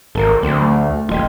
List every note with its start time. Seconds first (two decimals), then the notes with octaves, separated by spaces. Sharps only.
0.15 G#1 A4 A#4
0.43 D2 C4
0.61 A3
1.09 D#1 F4 D#5 G5